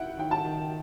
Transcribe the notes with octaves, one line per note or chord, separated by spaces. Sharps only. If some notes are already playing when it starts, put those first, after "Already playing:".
Already playing: E4 E5 F#5 G5
D#3 G5
A5
D#3